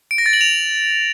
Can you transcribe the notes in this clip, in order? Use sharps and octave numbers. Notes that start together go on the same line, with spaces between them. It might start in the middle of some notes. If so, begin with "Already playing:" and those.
D7
A#6
A6
F#7
F7